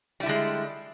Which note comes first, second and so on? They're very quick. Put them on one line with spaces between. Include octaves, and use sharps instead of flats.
G3 E4 D3 G#3